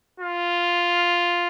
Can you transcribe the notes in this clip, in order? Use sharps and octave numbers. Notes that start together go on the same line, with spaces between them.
F4